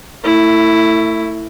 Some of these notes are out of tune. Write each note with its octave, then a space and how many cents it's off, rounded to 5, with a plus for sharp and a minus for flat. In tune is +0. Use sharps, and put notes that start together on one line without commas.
A3 +25 E4 +0